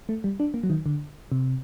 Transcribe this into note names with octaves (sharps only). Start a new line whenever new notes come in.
A3
G3
D4
A#3
F#3
D#3
D3
C3